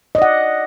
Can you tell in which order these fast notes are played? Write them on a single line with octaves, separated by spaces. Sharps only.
D#5 D5 F#5